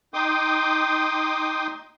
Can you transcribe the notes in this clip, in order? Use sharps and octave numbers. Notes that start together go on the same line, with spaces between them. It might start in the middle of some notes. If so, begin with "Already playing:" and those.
D#4 G5 C6 D6 D#6